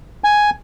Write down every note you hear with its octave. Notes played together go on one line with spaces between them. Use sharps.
G#5